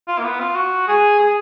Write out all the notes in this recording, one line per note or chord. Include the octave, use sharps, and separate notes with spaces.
F4
A#3
B3
F4
F#4
G#4
G#4